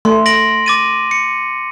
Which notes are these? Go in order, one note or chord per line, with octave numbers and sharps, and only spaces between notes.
A3 C6
A#6 D7 F#7
D6 A6 D#7
C#7